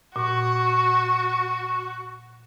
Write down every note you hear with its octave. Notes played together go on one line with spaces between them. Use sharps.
A#2 F#4 C#6